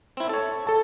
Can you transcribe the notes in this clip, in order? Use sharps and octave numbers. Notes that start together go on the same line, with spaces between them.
C4 E4
A4 C#5
A4 A5